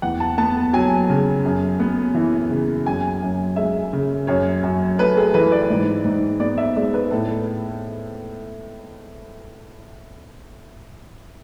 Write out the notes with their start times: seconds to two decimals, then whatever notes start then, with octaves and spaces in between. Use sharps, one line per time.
0.02 E2 F#5
0.20 A5
0.38 B3 A5
0.73 F#3 G#5
1.09 C#3
1.45 F#2
1.80 B3
2.15 E3
2.50 C#3
2.86 F#2 G#5
3.22 F#2
3.56 G#3 E5
3.93 C#3
4.27 F#2 C#5
4.63 F#2
4.98 A3 B4
5.17 G#4
5.34 E3 B4
5.52 D5
5.70 G#2
6.04 G#2
6.40 B3 D5
6.58 E5
6.76 G#3 D5
6.94 B4
7.11 A2 A4